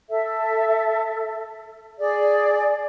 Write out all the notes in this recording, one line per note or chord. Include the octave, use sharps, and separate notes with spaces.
A4 E5
G#4 D5